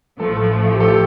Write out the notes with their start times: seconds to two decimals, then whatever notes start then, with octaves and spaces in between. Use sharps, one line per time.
0.19 A1 A2 F3 A3 A4
0.72 G4
0.80 A4
0.88 G4